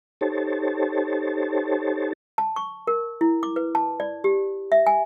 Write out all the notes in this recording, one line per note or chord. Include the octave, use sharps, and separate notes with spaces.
D#4 G4 A4 C5 C#5 A5
A5
C#6
A#4
E4
D6
B4
A5
D5
G4
E5
G#5